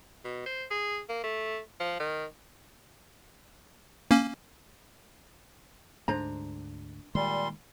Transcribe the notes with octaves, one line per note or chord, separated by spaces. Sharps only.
B2
C5
G#4
A#3
A3
F3
D#3
A#3 C#4
D2 G#2 G#3 D4 C5 A#5
A#2 D#3 G3 G#3 A#3 C6